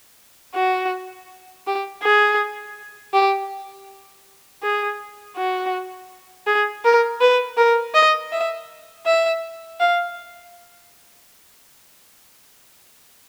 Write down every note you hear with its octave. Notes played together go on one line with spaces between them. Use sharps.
F#4
G4
G#4
G4
G#4
F#4
G#4
A#4
B4
A#4
D#5
E5
E5
F5